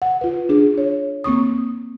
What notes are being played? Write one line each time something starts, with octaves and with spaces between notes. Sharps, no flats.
F#5
F4 B4
D4 G#4
C#5
A#3 C4 C#6 D#6